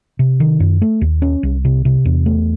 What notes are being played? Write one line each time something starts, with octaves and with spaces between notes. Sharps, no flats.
C3
D#3
F#2
A3
D#2
C#4
C2
C3
C3
E2
A3